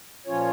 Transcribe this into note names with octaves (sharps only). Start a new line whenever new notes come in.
A#2 F3 C#4 F4 C#5